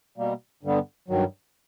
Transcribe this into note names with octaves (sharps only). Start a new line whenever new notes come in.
B2 G3 A#3
G2 D3 G3 B3
G2 D#3 F#3